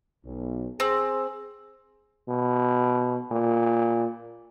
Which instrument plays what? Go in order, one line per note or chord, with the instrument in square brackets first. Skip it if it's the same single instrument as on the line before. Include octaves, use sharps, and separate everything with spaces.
[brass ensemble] B1
[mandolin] C4 [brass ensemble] G#4
[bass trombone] B2
A#2